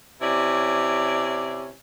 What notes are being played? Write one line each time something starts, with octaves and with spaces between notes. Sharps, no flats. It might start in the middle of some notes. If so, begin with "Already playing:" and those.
C3 C#4 E4 D5